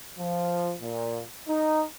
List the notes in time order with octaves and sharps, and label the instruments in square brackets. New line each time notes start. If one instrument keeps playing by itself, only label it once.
[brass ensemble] F3
A#2
D#4